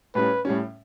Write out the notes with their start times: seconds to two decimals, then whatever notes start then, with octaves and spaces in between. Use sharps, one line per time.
0.15 A2 G3 C#4 B4
0.45 A2 G3 C#4